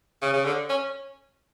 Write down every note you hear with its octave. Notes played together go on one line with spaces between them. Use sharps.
C#3
C#3
D3
C#4